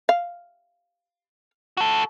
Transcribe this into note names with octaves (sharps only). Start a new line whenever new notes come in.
F5
F#4 A4